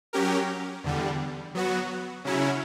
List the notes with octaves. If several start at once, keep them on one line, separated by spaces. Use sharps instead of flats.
F#3 C#4 G4 A#4
E2 D3 G3
F#3 B3 F#4
C#3 F#3 C#4 E4